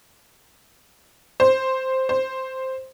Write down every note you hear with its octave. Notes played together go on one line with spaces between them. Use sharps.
C5
C5